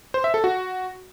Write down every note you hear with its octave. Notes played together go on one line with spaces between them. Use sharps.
C5
E5
A4
F#4